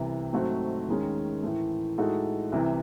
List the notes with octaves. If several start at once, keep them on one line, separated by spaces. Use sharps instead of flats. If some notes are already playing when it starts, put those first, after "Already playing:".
Already playing: C2 C3 E3
G#2 F#3 A3 C4 F#4
D#2 D#3 G#3 C#4
A2 E3 A3
A2 G#3 D#4 F#4 A4
C2 C3 E3